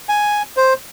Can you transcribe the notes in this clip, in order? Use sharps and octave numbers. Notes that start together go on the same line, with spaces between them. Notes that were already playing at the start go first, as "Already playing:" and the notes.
G#5
C5